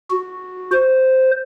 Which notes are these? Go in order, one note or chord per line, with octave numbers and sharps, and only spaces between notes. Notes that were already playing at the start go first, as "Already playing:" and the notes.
F#4
C5